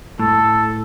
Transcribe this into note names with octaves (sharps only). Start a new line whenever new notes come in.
A2 A4